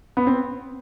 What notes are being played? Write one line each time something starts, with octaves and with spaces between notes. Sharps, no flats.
B3
C4